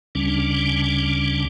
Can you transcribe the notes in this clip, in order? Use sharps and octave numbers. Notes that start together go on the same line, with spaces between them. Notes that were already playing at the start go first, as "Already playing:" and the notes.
D2 C#3 G3 C#4 D4